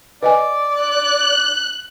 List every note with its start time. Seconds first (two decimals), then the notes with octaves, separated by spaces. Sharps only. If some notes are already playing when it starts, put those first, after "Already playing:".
0.23 B4 D5 D#5 G#5
0.79 F#6